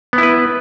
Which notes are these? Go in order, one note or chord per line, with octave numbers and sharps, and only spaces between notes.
B3 E4 B4